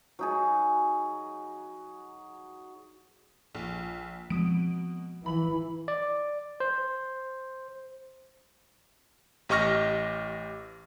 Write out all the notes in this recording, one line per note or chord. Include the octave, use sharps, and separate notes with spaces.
F#3 D#4 G#4
A#1
B2 F3 G#3 C4 D#6 D7
E3 B5 F#7
D5
C5
A1 G4 D#5 C#6 F6 A#6